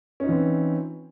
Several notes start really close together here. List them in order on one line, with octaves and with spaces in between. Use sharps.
C#4 D#4 F4 E3 C4